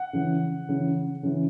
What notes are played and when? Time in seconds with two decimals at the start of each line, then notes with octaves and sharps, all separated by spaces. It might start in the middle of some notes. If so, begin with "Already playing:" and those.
Already playing: F#5
0.13 C#3 E3
0.69 C#3 E3
1.23 C#3 E3